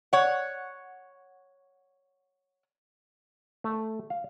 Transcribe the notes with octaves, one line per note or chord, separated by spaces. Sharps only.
C#5 F#5
A3
F5